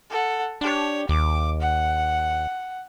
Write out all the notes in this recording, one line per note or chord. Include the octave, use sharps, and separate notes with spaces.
A4 F#5
D4 G4 C#5
D#2 D6
F#5